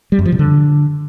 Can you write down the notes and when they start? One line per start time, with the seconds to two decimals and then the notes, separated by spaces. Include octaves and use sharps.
0.12 G3
0.19 F#2
0.26 F3
0.32 C3
0.39 D3